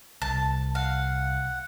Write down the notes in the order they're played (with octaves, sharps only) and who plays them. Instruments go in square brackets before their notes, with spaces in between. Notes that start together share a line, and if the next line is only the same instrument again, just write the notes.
[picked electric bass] C2 [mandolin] A5
[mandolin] F5 [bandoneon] F#5